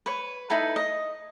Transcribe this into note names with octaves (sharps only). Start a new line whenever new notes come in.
B4 C#5
D#4 E4 A4 B4
D#5